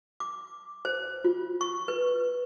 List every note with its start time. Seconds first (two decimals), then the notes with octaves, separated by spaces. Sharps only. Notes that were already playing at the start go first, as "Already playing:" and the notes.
0.20 D6
0.85 C5
1.24 F4
1.61 C#6
1.88 B4